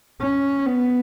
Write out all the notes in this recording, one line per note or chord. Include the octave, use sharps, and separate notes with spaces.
C#4
B3